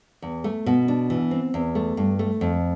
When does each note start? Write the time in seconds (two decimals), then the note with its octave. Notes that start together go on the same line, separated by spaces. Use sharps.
0.22 E2
0.44 A3
0.66 B2
0.88 D4
1.10 E3
1.31 C4
1.54 E2
1.75 A3
1.97 G2
2.19 A3
2.41 F2